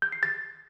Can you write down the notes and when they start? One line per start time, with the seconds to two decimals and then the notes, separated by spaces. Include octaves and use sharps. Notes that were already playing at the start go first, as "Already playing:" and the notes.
0.02 G6
0.12 C7
0.23 A6